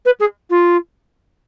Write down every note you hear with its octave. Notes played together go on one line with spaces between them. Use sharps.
B4
G#4
F4